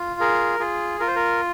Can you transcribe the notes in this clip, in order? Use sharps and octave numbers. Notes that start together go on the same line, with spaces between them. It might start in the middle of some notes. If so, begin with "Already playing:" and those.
Already playing: F4
G#4 A#4
F4 G#4
F4 A#4
C5
A#4